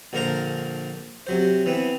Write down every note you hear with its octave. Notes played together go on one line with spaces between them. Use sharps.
A#1 D3 A#3 A#4 C5 A#5
C3 F#3 C5
E3 B3 C4